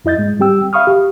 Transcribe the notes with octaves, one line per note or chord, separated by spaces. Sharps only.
F2 E4 D#5 G6 A6
G#2 G#3
G3 C4 G4 G5 E6
E5 F5 B5 C#6 D#6 F6
G4